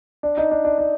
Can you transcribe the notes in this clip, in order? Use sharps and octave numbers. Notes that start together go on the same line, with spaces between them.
D4
D#4
D4
D4
D4